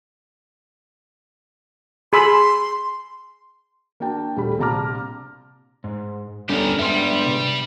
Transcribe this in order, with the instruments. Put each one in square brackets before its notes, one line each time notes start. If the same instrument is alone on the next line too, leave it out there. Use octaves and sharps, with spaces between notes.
[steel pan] G#4 B5 E6 [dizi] C6
[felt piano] A#3 D4 F#4 G5 A5
D#1 G3 A3 F#4 G4 B5
A#1 C3 A5 A#5 D6 F6
[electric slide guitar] G#2
[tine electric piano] G3 C#4 [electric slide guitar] B3 D4 A4 [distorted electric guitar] G4 A#4
[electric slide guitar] G#2 B3 D4 [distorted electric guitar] G3 [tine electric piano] E5 C6
[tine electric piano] C3